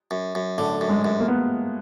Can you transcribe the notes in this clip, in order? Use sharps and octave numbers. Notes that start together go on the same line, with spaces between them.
F#2
F#2
A2 D3 A3
F#2
G#2 G#3
F#2
A#3
B3